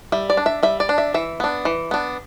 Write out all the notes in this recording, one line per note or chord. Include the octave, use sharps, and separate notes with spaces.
G3 E5
D5
D4
E5
G3 E5
D5
D4
E5
E3 E5
B3 D4
E3
B3 D4